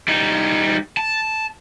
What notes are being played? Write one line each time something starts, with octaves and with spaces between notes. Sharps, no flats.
G3 D#4
A5